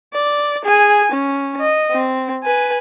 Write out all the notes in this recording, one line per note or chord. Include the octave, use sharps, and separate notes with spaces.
D5
G#4 G#5
C#4
D#5
C4
B4 G#5